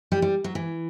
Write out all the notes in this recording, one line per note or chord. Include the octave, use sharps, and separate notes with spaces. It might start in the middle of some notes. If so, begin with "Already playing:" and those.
G3
G3
F#3
E3